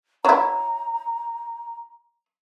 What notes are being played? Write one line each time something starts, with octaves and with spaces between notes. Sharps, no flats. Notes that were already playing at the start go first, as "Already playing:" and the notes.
F#3 E4 A#5